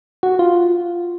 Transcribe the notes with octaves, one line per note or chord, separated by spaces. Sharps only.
F#4
F4